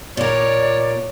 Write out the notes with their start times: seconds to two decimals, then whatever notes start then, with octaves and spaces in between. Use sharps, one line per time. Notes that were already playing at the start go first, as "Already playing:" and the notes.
0.17 A#2 A#4 C#5 D5